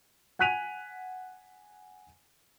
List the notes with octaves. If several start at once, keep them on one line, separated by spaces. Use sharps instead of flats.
F#5 G#5 F#6 B6 D#7 F7